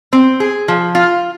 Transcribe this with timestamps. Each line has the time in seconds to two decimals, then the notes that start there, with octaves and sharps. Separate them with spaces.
0.13 C4
0.40 G#4
0.68 F3
0.95 F4